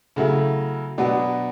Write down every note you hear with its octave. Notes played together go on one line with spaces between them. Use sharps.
C#3 F#3 A3 E4
B2 F#3 B3 D4